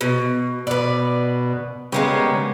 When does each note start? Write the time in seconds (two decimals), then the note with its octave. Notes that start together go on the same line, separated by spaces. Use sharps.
0.01 B2
0.67 B2 B4 D5
1.92 C#3 G3 G#3 A#3 B3